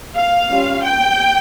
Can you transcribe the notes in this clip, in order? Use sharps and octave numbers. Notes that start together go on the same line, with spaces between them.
F5
G3 C#4 F4
G5